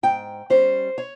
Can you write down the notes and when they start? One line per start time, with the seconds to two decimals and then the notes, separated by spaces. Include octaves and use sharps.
0.03 G#2 G5
0.50 G3 C#4 C5
0.98 C#5